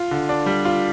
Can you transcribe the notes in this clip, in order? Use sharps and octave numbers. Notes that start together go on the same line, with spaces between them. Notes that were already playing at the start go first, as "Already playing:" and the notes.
Already playing: F4
D3
D4
G3
F4